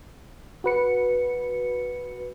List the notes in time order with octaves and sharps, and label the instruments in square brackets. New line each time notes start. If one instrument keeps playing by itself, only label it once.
[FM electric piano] F#4 B4 C#7